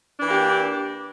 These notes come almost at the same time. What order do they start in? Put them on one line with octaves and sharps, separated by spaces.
D4 E3 A#3 G4